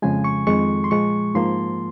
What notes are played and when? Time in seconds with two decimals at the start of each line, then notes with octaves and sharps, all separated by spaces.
0.02 F2 C#3 F3 G#3 G#5
0.24 C#6
0.47 F2 D#3 G#3 C#6
0.84 C6
0.91 A#2 F3 G#3 C#6
1.35 G#2 F3 A#3 C6